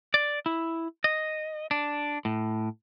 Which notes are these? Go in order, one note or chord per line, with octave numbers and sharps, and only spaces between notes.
D5
E4
D#5
D4
A2